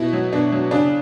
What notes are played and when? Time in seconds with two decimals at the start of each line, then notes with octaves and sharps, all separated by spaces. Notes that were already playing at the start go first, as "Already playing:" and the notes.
Already playing: B2 E4
0.13 F#3
0.33 B2 D4
0.52 F#3
0.71 C#3 D4